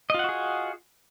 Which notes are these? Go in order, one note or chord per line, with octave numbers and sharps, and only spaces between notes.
F4 F#4 G#4 D#5 F#5